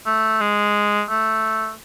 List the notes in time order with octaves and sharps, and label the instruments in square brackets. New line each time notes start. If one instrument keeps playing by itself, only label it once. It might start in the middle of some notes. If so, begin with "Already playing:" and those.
[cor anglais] A3
G#3
A3